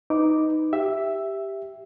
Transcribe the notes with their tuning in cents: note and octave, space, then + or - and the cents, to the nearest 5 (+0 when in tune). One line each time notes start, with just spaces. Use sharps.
D#4 +0 B4 +15 D6 -5
G4 +0 E5 +0